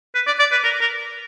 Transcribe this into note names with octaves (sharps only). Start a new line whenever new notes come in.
B4
D5
D5
B4
A#4
A#4